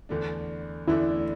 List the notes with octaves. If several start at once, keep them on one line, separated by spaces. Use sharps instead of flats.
E2 D3 A3 D4
E2 D3 A3 D4 E4